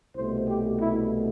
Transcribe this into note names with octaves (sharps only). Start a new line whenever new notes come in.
C2 B2 A3 C5
G4
E4